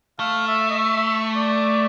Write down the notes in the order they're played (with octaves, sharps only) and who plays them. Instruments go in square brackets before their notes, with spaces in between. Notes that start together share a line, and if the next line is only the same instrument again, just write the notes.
[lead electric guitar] A3 [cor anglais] F5
[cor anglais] E5
D#5
E5
E5
D5